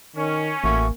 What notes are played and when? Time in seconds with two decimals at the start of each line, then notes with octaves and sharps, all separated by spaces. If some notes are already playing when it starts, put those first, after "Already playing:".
0.16 D#3 C#4
0.64 A1 A3 A#3 F#4